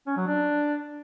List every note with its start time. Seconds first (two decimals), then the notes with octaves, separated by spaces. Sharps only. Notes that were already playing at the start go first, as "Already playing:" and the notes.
0.07 C#4
0.17 F#3
0.27 D4